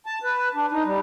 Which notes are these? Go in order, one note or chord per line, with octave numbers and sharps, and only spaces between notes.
A5
B4
D4
D#4
G3